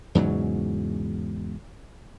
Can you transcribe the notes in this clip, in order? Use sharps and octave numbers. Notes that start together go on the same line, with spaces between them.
E2 G#2 C#3 F#3